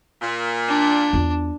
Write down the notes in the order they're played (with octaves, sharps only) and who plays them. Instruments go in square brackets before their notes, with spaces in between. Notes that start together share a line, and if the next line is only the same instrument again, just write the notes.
[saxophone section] A#2
[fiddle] D4
[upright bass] E2 F4